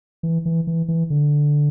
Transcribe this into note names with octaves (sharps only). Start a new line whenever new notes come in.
E3
E3
E3
E3
D3